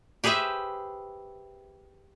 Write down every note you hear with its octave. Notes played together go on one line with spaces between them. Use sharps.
G4 G#4 B4 C5 E5